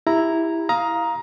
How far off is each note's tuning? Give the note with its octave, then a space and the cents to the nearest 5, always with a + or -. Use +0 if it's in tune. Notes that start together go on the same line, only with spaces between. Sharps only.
E4 +0 G4 +20 A#5 +0
F5 +0 A#5 +15 D#6 +15